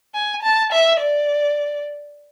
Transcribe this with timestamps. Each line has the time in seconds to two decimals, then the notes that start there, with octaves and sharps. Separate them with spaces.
0.14 G#5
0.43 A5
0.72 E5
1.00 D5